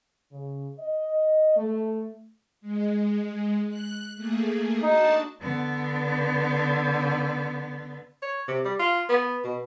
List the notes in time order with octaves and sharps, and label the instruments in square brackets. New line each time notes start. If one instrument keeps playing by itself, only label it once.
[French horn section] C#3
D#5
A3
[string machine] G#3
F#6
A3 A#3 G#4
[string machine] D4 F#4 A5 [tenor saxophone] D#4
[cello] D3 B3
[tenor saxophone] C#5
C3
G3
F4
B3
B2